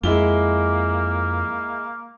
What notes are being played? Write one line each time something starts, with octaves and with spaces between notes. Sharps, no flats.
F2 G#3 A#3 E4 G7